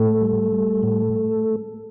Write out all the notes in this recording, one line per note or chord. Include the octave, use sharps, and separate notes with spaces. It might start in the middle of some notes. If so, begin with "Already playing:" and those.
Already playing: A2 A3 A4
G3
G3
A2